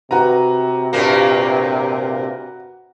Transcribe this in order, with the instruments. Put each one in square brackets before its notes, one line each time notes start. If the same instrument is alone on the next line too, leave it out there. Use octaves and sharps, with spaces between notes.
[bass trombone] C3 [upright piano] F#4 B4 A#5
[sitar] G2 A#2 A#3